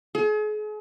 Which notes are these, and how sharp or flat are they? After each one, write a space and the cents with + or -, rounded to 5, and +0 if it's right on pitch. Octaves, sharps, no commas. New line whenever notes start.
G#4 +40